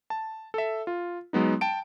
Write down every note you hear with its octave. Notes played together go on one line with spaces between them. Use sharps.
A5
A4 E5
F4
F#3 G#3 B3 D#4
G5 A5 D7